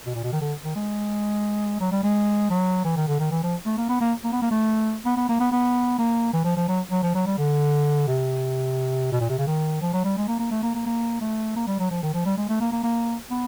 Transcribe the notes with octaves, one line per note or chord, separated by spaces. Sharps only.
B2
A#2
B2
D#3
D3
D#3
G#3
F#3
G3
G#3
F#3
E3
D#3
D3
D#3
E3
F3
A3
A#3
B3
A#3
A#3
B3
A#3
A3
B3
B3
A#3
B3
B3
A#3
E3
F3
F3
F#3
F#3
F3
F#3
G3
D3
C3
B2
A#2
C3
C#3
D#3
F3
F#3
G3
G#3
A#3
A#3
A3
A#3
A#3
A#3
A3
A#3
G3
F#3
F3
D#3
F3
G3
G#3
A3
A#3
A#3
A#3
B3